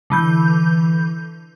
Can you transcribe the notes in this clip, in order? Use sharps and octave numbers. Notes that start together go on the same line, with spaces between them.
D3 E3 G6